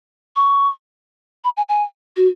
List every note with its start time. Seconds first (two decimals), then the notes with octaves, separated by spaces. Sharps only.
0.36 C#6
1.44 B5
1.57 G#5
1.69 G#5
2.17 F#4